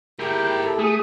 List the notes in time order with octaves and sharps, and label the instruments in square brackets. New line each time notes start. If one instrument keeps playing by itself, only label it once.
[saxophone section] A#3 E4 G4 [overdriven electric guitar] G#4 A#4 [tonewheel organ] G5
[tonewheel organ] A4
[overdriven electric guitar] A3 [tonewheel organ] G#4 D#6